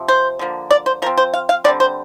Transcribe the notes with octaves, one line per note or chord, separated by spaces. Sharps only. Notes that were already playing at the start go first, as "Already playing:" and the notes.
Already playing: C3 F3
C5
D3 F3 A#3
D5
C5
F3 C4 A#4
C5
F5
F5
D3 G3 C4 D5
C5